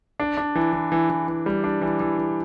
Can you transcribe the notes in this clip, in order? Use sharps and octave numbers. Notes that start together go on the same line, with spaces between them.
D4
D4
E3
E3
E3
E3
E3
G3
D4
E3
E3
E3